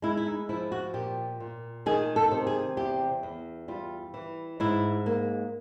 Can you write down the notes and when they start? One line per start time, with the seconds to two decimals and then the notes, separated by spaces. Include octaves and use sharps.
0.02 G#3 E4
0.17 E4
0.26 D#4
0.49 F3 E4
0.72 F#4
0.94 A#2 G4
1.40 A#2
1.86 D#3 G#4
2.16 A4
2.31 C3
2.47 G#4
2.77 E2 G4
3.23 E2
3.68 G3 F4
4.14 E3
4.60 G#2 E4
5.06 A#3